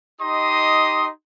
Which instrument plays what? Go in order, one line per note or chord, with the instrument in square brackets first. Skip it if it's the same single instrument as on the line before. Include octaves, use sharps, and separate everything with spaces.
[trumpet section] D#4 G4 D#5 C6 D#6